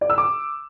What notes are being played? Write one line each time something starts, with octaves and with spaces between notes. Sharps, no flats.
D5
E6
D6